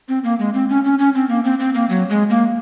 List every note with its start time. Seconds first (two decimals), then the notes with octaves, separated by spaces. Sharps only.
0.09 C4
0.24 A#3
0.39 G#3
0.54 C4
0.69 C#4
0.85 C#4
0.99 C#4
1.15 C4
1.29 A#3
1.44 C4
1.59 C4
1.74 A#3
1.89 F#3
2.09 G#3
2.30 A#3